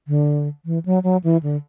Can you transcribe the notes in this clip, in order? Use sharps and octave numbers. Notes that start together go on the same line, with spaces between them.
D3
E3
F#3
F#3
E3
D3